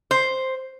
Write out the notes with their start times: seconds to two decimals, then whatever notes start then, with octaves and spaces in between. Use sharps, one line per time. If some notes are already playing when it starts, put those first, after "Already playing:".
0.11 C5